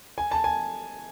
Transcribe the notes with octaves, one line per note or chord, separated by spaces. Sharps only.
G#5
A5
G#5